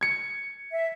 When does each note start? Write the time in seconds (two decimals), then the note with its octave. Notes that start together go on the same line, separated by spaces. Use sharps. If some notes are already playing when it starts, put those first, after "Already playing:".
0.01 G#6 C#7
0.73 E5